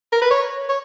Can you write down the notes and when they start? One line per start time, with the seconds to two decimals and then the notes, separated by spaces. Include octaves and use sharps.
0.12 A#4
0.21 B4
0.31 C#5
0.69 C#5